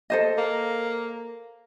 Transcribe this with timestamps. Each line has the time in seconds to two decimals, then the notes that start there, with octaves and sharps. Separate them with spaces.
0.10 A4 C5 D#5
0.38 A#3